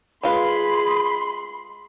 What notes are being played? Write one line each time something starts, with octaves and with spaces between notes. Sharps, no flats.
G#3 F4 G#4 B4 B5 C6